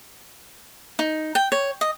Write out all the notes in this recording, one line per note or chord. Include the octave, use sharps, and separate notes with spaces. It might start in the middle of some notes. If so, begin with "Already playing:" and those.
D#4
G5
C#5
D#5